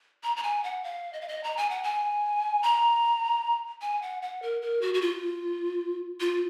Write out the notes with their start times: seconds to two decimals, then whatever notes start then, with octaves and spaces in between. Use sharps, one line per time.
0.24 A#5
0.37 A#5
0.43 G#5
0.64 F#5
0.84 F5
1.13 D#5
1.21 F5
1.28 D#5
1.44 A#5
1.57 G#5
1.70 F#5
1.83 G#5
2.63 A#5
3.81 G#5
4.02 F#5
4.22 F#5
4.42 A#4
4.62 A#4
4.81 F#4
4.94 F#4
5.01 F4
6.20 F4